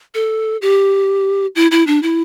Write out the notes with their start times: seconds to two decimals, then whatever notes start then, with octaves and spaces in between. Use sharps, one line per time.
0.15 A4
0.62 G4
1.55 E4
1.71 E4
1.87 D4
2.03 E4